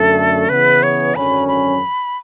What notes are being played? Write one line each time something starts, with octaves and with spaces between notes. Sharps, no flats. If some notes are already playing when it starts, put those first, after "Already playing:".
Already playing: F#2 D3 A3 A4
C#3 E3 B3 B4
C#5
G#1 F#2 D3 F#3 C#4 B5
B5